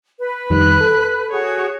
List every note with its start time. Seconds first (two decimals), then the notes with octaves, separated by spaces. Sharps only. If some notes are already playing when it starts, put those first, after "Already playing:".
0.19 B4
0.50 F2 D#3 G3 B5 F#6
0.81 A4
1.31 F#4 G#4 C#5